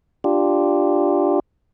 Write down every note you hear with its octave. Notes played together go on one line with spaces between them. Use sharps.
D4 F4 G4